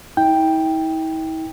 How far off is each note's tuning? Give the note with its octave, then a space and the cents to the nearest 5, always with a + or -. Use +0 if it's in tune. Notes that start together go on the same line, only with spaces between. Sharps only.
E4 -45 G5 +5